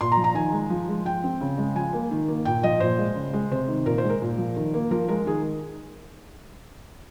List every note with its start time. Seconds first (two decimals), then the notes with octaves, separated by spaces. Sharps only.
0.01 A#2 C6
0.12 A#5
0.17 F3
0.24 A#5
0.35 D#3 G#5
0.52 G#3
0.70 F3
0.88 G#3
1.05 F3 G5
1.23 C4
1.41 C#3
1.58 G#3
1.75 F3 G#5
1.93 A#3
2.11 D#3
2.28 A#3
2.45 A#2 G5
2.63 F3 D#5
2.80 A#2 C5
2.99 G#3
3.15 C#3
3.33 G#3
3.51 C3 C5
3.69 D#3
3.85 A#2 A#4
3.98 C5
4.04 G#3
4.10 A#4
4.22 A#2
4.38 F3
4.56 D#3
4.74 A#3
4.91 F3 A#4
5.08 G#3 A#4
5.26 D#3 G#4